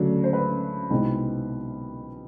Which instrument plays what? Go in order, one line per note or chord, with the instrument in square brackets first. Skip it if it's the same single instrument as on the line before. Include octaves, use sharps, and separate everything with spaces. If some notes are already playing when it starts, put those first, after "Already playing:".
Already playing: [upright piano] D2 C#3 F#3 A3 D4
C5
B4
C2 B2 G#3 C4 D#4